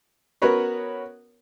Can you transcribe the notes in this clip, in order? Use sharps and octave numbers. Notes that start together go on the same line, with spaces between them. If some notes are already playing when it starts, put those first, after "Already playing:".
B3 C#4 F#4 A#4 B4 C#5